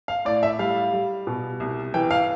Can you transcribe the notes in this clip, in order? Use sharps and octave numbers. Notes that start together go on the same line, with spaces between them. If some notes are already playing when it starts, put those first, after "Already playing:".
F5
A2 D5
E5
G3 F5
G3
B2
C2
E3 G5
F5